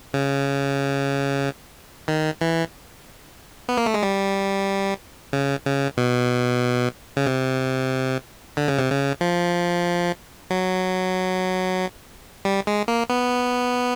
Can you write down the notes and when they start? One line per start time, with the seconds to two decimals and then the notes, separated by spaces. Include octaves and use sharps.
0.14 C#3
2.08 D#3
2.41 E3
3.69 B3
3.78 A#3
3.86 A3
3.94 G#3
4.03 G3
5.33 C#3
5.65 C#3
5.97 B2
7.17 C#3
7.27 C3
8.57 D3
8.68 C#3
8.78 C3
8.91 C#3
9.21 F3
10.50 F#3
12.45 G3
12.67 G#3
12.88 A#3
13.10 B3